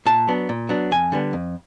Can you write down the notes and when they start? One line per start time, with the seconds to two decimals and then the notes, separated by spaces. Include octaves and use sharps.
0.06 A#2 A5
0.28 F#3 B3 D4
0.49 A#2
0.69 F#3 B3 D4
0.91 F2 G#5
1.12 D3 G3 B3
1.33 F2